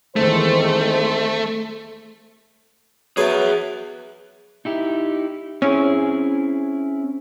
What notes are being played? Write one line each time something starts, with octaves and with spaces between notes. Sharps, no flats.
E2 D#3 G#3 A3 C4 C5
F#3 B3 G#4 E5 G#5
D#4 E4 G4
C4 C#4 E4 G#4